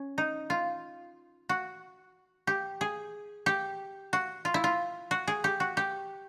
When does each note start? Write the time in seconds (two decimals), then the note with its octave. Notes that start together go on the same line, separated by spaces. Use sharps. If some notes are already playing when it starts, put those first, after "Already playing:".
Already playing: C#4
0.18 D#4
0.50 F4
1.49 F#4
2.47 G4
2.81 G#4
3.46 G4
4.13 F#4
4.45 F4
4.54 E4
4.64 F4
5.11 F#4
5.28 G#4
5.44 G4
5.60 F#4
5.77 G4